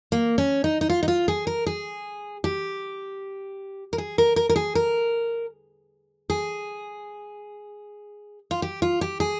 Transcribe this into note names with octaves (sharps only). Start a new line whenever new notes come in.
A#3
C#4
D#4
D#4
F4
D#4
F4
G#4
A#4
G#4
G4
A#4
G#4
A#4
A#4
A#4
G#4
A#4
G#4
F4
G4
F4
G4
G#4